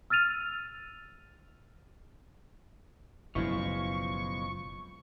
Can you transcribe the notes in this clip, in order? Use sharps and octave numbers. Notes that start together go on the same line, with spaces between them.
E6 F6 A6 D#7 F7
F#1 B2 F3 G#3 E4 F4 C#6